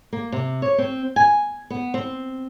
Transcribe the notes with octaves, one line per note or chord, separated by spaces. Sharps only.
A#3
C3
C#5
C4
G#5
B3
C4